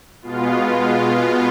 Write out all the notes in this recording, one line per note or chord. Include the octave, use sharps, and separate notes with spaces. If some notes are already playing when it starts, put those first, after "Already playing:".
B2 G#3 B3 F4